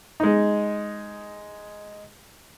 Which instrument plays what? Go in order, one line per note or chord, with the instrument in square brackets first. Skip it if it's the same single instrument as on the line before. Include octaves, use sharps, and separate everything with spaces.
[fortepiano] G#3 D#4